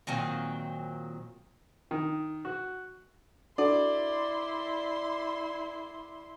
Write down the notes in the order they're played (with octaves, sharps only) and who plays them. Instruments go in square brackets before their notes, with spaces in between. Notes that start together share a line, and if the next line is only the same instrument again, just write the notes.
[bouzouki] A#2 D#3 F#3 C4
[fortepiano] D#3
F#4
[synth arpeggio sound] D4 F#4 A4 [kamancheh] E4 C6 [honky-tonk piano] D5